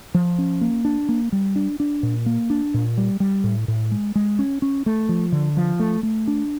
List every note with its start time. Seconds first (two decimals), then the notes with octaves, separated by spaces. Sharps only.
0.14 F3
0.38 C#4
0.61 A#3
0.85 D4
1.09 A#3
1.32 G3
1.56 D4
1.80 D4
2.03 A#2
2.26 A#3
2.50 D4
2.74 A#2
2.97 G3
3.20 G3
3.44 A2
3.68 A2
3.91 G#3
4.15 G#3
4.39 C#4
4.62 C#4
4.86 A3
5.09 F3
5.32 D3
5.57 F3
5.79 A3
6.03 A3
6.27 D4